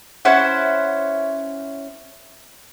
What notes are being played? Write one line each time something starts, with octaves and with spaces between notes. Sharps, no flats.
C#4 E4 C5 F#5